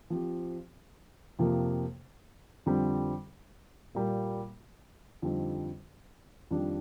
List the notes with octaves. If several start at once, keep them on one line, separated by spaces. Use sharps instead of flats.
F3 C4 G4
F2 C3 F3 A#3
F2 D3 G3 C4
A#2 G3 A#3
F2 D3 G3 C4 D#4
F2 D#3 G3 D4 G4